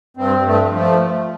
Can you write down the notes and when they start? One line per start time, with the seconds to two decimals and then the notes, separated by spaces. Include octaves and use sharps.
0.17 G2 C4
0.39 G2
0.46 A3
0.62 F3
0.77 A3